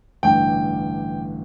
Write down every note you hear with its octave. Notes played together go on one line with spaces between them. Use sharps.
A1 G2 D3 G5